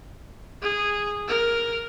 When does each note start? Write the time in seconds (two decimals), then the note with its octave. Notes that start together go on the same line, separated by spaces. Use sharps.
0.62 G#4
1.28 A#4